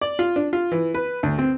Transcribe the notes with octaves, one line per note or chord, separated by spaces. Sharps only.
D5
F4
D4
F4
E3
B4
D2
C4